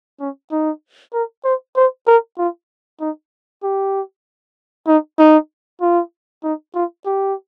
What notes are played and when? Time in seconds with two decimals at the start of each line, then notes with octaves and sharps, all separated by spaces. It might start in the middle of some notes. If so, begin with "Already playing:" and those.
0.20 C#4
0.51 D#4
1.13 A#4
1.44 C5
1.76 C5
2.07 A#4
2.38 F4
3.01 D#4
3.63 G4
4.87 D#4
5.19 D#4
5.81 F4
6.43 D#4
6.74 F4
7.06 G4